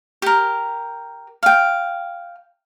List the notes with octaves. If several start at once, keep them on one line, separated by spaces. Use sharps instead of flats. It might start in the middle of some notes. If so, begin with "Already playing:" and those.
G4 A#4
F5 G5